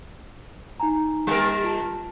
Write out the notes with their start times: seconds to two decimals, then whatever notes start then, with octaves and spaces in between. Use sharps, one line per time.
0.80 D#4 G#5 A#5
1.27 G3 A#4
1.40 A6
1.64 F4 A5